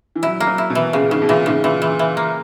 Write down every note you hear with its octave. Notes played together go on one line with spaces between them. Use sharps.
E3
F#3 E4
A#3
F#3
E4
B2
E3
A#2 C#3
G#2 C#3
B2
A#2 E3
G#2 C#3
A#2 E3
E3
E3
A#3